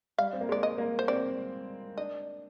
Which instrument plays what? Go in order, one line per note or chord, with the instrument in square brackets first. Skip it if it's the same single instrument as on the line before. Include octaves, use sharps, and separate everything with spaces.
[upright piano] G3 [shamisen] F5
[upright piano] C4
A#3
[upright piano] G#3 [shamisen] D5
[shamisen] D#5
[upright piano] A#3
[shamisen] C5
[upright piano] C4 [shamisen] D5
[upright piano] D4 [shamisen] D#5